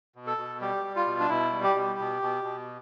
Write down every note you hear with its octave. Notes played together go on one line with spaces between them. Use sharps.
B2
A4
B2
G3 G4
G3
F4
B2
D4
B2 E4
G3
G4
B2
B2
B2
B2